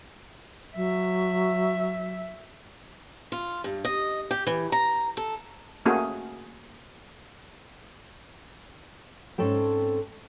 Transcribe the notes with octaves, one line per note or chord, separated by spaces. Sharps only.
F#3 E5
F4
G2
D#5
G4
E3
A#5
A4
A3 A#3 C#4 F#4 G#4
G#2 C4 C#4 A4 G5